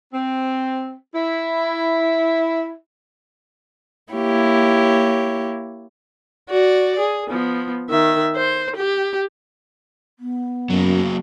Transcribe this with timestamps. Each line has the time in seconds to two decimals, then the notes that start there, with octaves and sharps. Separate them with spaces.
0.13 C4
1.15 E4
4.12 A#3 E4 G4 C#5
6.50 F#4 D5
6.99 G#4
7.29 F3 B3
7.90 D#3 E5
8.36 C5
8.76 G4
10.19 B3
10.70 F#2 F#3 A#3